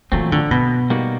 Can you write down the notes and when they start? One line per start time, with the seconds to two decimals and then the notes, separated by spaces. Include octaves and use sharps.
0.12 A#2 E3 F#3 A3 C4
0.32 D3
0.51 B2
0.90 G3 A#3 D#4 F#4